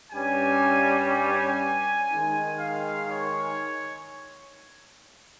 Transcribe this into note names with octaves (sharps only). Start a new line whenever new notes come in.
G2 G3 C#4 G#5
G#5
D#3 G#3 D#4
F5
C#5